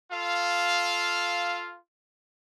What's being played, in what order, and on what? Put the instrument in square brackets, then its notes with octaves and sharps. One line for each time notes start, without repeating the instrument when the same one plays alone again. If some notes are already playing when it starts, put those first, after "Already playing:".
[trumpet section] F4 A4 F5